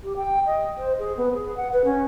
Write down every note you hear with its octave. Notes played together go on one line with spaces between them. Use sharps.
G4
G5
D#5
C5
G#4
B3
G#4
F#5
B4
C#4